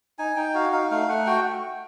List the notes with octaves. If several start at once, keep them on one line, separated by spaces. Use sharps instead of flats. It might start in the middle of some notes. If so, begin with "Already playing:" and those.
D#4 G#5
D#4 G5
F#4 F5
D#4 F5
A3 F5
A3 F#5
F#4 G5